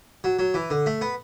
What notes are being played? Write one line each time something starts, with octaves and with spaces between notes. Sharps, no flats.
F#3
F#3
E3
D3
A3
B3